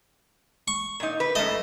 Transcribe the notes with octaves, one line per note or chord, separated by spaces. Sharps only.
C#6
A#2 D#4
B4
F#2 A3 D#5